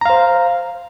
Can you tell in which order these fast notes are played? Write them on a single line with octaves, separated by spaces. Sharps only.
A#5 F5 C5